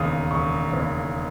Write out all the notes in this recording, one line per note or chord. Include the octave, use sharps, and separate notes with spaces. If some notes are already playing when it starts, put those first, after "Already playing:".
Already playing: E1 D#2 C#3 D#6
E1 C#6
D#2 C#3